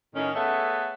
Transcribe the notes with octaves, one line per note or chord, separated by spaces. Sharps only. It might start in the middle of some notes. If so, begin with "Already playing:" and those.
A2 D#3 C#4
A3 B3 G#4 A4 C#5 E5